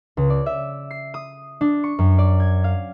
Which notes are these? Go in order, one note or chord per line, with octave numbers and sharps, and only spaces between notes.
C#2
D5
E5
C7
D#6
D4
C#6
F#2
D5
G#6
F5